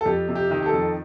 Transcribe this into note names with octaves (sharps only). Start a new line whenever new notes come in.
A4
F2 G4
C3
G4
D#3
G4
A4
F2